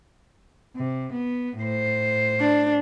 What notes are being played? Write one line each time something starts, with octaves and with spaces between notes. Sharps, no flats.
C3
B3
A2 C5
D4